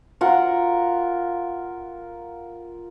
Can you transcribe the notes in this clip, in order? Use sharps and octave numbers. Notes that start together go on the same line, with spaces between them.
F4 A#4 F#5